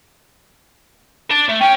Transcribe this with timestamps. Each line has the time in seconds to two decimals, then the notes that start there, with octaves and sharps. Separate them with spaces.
1.31 D5 A5
1.49 A3
1.61 C#4 G5